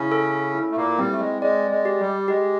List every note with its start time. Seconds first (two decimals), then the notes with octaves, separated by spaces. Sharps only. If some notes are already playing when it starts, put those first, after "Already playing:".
Already playing: C#3 C#4 E4
0.12 A4
0.55 E4
0.71 A3
0.77 A#2 A#3
0.99 G3 C4
1.12 A3
1.20 G#3
1.42 G#3 D5
1.71 G#3
1.85 G4
2.00 G3
2.28 G#3 G4